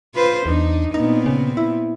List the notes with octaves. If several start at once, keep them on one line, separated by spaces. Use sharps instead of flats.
F4 B4 C5
E2 D4 D#4
A#2 B3 C4 D#4
C#3
E4